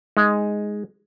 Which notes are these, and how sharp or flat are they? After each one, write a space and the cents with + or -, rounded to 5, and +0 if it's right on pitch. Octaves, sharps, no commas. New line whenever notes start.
G#3 +0 D#4 +5